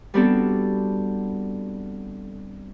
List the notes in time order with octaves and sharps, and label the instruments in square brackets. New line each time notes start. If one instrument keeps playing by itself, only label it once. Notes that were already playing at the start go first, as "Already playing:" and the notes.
[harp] G3 B3 C4 D4 F#4 A4